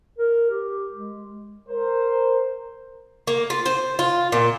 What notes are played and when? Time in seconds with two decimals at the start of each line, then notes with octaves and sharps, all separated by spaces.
0.18 A#4
0.50 G4
0.92 G#3
1.68 A#4 C5
3.27 A#3
3.50 F4
3.66 C5
3.99 F4
4.32 A#2